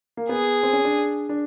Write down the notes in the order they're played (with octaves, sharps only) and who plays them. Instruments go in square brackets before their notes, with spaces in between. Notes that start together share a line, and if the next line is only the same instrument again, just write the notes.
[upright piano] A#3
[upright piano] B3 [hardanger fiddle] G#4
[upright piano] C4
C#4
D4
D4